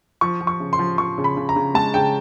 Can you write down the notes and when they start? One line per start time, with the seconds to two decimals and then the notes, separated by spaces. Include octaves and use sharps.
0.21 F3 C#6
0.41 F3
0.47 C#6
0.60 C#3
0.73 C6
0.79 F3
0.98 F3 C#6
1.18 C#3
1.24 B5
1.37 C#3
1.49 A#5
1.56 C#3
1.74 G#3 A5
1.94 C#3 G5